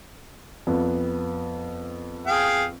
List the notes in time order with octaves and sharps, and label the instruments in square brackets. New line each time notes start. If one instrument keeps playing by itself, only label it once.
[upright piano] F2 B3
[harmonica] G#4 F5 G5